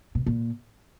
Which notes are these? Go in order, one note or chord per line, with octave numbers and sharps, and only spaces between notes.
B2
A#2